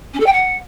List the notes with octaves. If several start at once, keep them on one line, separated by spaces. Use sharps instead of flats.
C#4
A4
G5
F#5